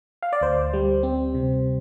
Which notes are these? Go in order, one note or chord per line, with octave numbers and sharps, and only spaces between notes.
F5
D5
D2 C5
G3
C4
C3